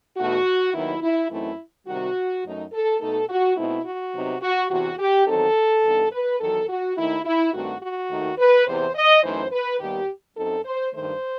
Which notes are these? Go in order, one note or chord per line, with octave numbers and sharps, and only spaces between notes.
E2 B2 A3 D#4 F#4
D#2 D#3 F#3 B3 D#4 E4
E4
F#2 E3 A3 C4 D#4 E4
C3 D#3 G3 F#4
F#2 F#3 A3 D#4
A4
B2 A3 D#4 A4
F#4
B2 A3 C4 D#4 E4
F#4
C3 F#3 B3 D#4
F#4
E2 C3 E3 F#4
G4
E2 D#3 F#3 C4 D#4 A4
G2 E3 B3 D#4
B4
E2 D#3 F#3 A4
F#4
D#2 D#3 A3 D#4 E4
E4
G2 D#3 A3 C4 F#4
F#4
D#2 D#3 A3 D#4
B4
E2 C3 E3 C5
D#5
F#2 E3 A3 D#4 C5
B4
D#2 D#3 G3 B3 G4
F#2 F#3 C4 D#4 A4
C5
G2 D#3 A3 C5